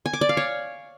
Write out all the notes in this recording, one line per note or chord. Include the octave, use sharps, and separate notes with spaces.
G#5
D6
D5
F5
C#5